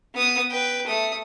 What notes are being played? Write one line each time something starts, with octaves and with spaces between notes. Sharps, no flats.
B3 D#6
B4 G5
A3 D#6